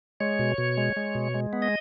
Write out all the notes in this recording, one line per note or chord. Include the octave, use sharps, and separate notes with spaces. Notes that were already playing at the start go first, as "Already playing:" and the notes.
G#3 C#5
B2
B2
G#3
G#3
B2
G#3
B3
D#5